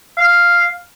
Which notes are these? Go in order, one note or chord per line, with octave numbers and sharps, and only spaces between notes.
F5